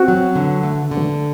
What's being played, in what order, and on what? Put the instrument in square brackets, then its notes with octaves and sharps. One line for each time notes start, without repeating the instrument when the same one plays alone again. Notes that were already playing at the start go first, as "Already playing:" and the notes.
Already playing: [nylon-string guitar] C4 [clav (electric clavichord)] F#4
[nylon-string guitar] F#3
D3
A3
D3